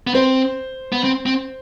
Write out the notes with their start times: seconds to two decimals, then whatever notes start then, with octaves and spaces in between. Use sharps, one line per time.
0.07 B3
0.14 C4 C5
0.92 B3
1.04 C4
1.26 C4